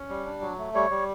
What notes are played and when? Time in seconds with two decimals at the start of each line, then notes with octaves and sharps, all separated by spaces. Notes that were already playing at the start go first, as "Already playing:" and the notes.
Already playing: C#4
0.09 G3
0.26 D4
0.41 F#3
0.58 A3
0.75 G3 C#5
0.90 G3